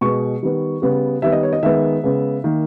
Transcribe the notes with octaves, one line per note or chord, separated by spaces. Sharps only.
B2 G#3 B3 C#6
D#3 G3 B3
C#3 G3 B3
D#3 G3 B3 E5
D#5
C#5
D#5
D#3 G#3 B3 E5
C#3 G#3 B3
D#3 A#3